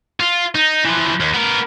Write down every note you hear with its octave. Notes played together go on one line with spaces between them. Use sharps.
F4
D#4
E3 F3
D#2
B3 A#4